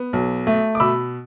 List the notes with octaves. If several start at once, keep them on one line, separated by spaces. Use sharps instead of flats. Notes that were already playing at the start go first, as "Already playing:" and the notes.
Already playing: B3
B1
A3
D6
B2 B5 E6